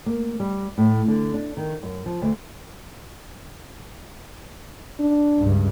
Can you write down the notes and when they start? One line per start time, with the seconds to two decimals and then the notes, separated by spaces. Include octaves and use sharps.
0.06 A#3
0.40 G3
0.78 A2
1.08 D3
1.34 D4
1.57 D#3
1.83 F#2
2.06 F3
2.22 D2
5.00 D4
5.39 C#2 G2